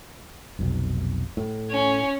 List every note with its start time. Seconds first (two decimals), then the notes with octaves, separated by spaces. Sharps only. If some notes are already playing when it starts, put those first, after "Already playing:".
0.59 F1 B1
1.37 A2
1.70 C#4